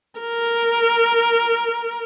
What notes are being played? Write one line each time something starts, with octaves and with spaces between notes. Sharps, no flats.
A#4